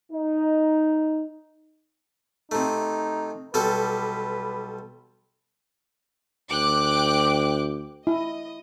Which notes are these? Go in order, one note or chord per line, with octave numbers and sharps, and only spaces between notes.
D#4
C3 A3 D#4
B1 G3 A4 B4
D2 G5 D6 F#6
E4 D#5